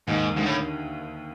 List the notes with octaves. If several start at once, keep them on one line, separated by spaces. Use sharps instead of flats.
D#2 G#2 D#3
D#3
D2 G#2 D3
A2